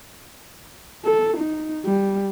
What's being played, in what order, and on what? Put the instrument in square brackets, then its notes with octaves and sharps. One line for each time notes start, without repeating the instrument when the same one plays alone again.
[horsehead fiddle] A4
D#4
G3